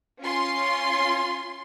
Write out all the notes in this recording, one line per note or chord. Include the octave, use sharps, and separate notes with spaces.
C#4 F4 C6